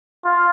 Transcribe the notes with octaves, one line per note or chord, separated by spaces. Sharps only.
F4